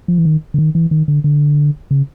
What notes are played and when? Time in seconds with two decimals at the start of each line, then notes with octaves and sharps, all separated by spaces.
0.08 F3
0.18 E3
0.25 D#3
0.54 D3
0.58 D#3
0.75 E3
0.91 D#3
1.08 D3
1.24 D3
1.91 C#3